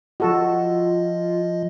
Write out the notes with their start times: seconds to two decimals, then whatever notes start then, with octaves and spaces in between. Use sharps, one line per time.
0.20 F3 F4 F#4 A4 D#5